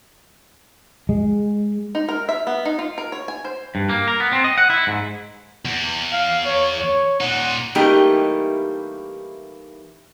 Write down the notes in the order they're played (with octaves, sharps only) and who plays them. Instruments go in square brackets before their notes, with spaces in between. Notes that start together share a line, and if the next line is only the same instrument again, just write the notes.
[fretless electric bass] G#3
[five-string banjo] D#4
A#4
E5
B3
D#4
F4
A#4
C#5
G#5
C5
[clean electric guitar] G2
A#3
A#4
B3
C4
D#5
F#5
E4
G#2
[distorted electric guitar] E2
[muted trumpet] F5
C#5
C#5
[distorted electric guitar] A#2 D#4 [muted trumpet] F#5
[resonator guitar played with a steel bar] E3 G3 A3 A#3 D#4 G4